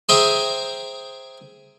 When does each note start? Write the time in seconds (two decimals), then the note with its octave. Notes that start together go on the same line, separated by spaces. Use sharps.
0.09 G#4 C5 E5 G5 A#5 C6